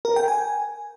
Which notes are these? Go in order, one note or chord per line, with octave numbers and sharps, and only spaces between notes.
A#4
G5
G#5